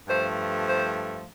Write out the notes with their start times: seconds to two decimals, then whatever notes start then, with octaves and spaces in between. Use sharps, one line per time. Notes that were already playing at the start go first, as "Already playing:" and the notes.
0.08 G2 F3 A3 C5
0.66 C5